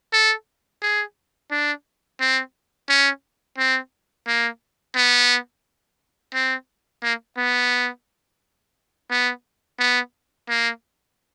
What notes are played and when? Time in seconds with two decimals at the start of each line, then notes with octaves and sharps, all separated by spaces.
0.13 A4
0.82 G#4
1.51 D4
2.20 C4
2.89 C#4
3.58 C4
4.27 A#3
4.96 B3
6.34 C4
7.03 A#3
7.37 B3
9.10 B3
9.79 B3
10.48 A#3